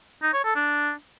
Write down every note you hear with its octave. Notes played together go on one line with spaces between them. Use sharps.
D#4
C#5
A4
D4